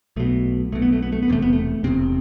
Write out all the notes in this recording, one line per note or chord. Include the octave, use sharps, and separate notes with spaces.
B1 B2 A3
B1 B2 A3
B3
A3
B3
A3
B3
E1 E2 C3 A3
B3
A3
E1 E2 C3 C4